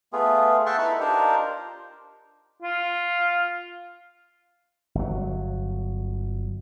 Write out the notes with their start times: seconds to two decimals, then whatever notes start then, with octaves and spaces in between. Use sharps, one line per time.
0.13 A3 B3 F4 G#4
0.66 E5 F#5 G5 A5 C6 C#6
0.78 D#4 E4 A4 B4 B5
1.00 D4 D#4 F4 G4 A#4 C5
2.63 F4
4.95 G1 F#3